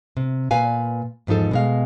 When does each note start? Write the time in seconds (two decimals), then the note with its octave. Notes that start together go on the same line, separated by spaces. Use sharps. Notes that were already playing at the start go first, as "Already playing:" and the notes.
0.17 C3
0.51 A#2 B4 F5 G#5
1.27 E2 G#2 F3 D#4 A4
1.51 B2 G#3 F5